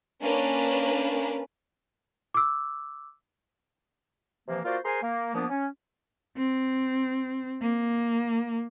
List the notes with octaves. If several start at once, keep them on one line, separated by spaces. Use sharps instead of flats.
A#3 C#4 D4 B4
D6 E6
C3 E3 F3 A#3
A#3 F4 F#4 C5 D5 F5
G#4 A#4 C5 G#5 A#5 C6
A#3
A#2 F3 A#3 B3 D4 D#6
C#4
C4
A#3